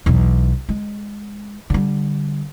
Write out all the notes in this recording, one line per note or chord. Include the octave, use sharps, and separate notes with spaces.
B1 E2
G#3
D3 G3